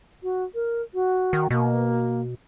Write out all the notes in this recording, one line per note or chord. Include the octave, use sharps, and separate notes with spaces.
F#4
A#4
F#4
D#3
B2 A#3